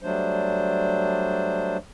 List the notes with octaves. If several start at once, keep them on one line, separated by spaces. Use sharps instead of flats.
F#3 G3 A3 D4 C5